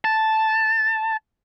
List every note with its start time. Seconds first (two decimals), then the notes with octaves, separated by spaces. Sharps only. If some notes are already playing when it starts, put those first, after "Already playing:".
0.05 A5